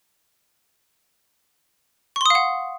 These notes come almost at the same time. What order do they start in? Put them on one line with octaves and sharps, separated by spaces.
C#6 C6 D#6 F5 F#5